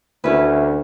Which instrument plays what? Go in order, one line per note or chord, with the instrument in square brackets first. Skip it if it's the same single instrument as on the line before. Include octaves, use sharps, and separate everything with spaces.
[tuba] D2 [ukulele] C#4 E4 B4